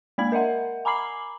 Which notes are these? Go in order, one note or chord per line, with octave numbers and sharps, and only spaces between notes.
G#3 A#3 D5 B5 G#6 F#7
A#4 D#5 E5 F#5
G#5 A#5 B5 D6 C7 F#7